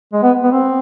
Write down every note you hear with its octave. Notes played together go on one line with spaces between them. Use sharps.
G#3
B3
B3
C4